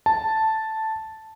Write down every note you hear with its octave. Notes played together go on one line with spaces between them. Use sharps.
A5